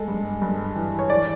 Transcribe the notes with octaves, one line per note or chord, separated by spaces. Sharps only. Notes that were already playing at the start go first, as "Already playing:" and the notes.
Already playing: G#3 A4
G2
G2
E3
C#5
E3 D5